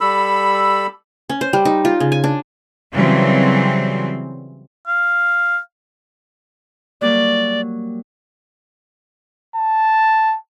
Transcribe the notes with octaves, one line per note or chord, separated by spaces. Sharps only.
G3 A4 B5 E6
C#4
C5
G3
D#4
F4
C#3
G#5
D4
C#3 E3 F#3 G3 C4
F5
F#3 G3 A#3 D5
A5